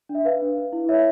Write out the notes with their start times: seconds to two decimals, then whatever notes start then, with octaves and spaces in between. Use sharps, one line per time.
0.09 D4
0.15 E5
0.25 B4 F5
0.41 D4
0.57 B4
0.73 E4
0.89 C#5 E5